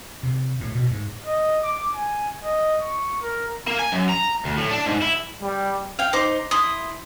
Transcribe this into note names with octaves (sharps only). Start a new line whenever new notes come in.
C3
A2
B2
G#2
D#5
D6
G#5
D#5
C#6
A#4
A#3
G#5
F#2
A#5
D2
A2
D4
G#2
E4
G3
F5 G5
D#4 C5 C6 D6
E4 C6 D#6